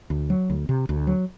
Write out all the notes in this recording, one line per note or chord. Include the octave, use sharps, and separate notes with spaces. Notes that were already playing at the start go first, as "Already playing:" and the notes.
D2
F#3
D2
C3
D2
F#3